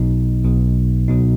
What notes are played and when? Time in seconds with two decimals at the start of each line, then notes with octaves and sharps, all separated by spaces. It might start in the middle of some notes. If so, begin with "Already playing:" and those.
Already playing: B1 B2 F#3 D#4
0.44 B1 B2 F#3
1.08 C#2 B2 F#3 D#4